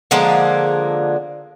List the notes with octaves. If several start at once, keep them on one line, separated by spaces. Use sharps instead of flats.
D3 F3 G#3 A#3